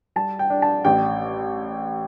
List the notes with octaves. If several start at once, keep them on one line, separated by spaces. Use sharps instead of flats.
G3 A5
G5
D4
A5
A1 G5